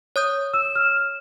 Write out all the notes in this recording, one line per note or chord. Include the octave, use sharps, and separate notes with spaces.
C#5 D#6 G6
E6 E7
F6